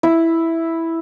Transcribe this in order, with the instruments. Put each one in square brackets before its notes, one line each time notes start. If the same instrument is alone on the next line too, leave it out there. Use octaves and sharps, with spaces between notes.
[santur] E4